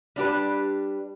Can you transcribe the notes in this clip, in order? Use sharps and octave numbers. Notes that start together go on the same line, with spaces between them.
G3 D4 G4 B4